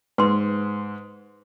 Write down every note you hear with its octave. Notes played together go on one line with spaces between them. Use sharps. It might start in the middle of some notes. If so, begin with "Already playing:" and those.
G#2 B4 C6